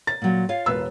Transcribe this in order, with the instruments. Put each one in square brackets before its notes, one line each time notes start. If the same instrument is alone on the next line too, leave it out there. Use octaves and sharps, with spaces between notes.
[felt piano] A6
[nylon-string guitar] A#2 F#3
F4 C#5 F5
[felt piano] E1 B4 E6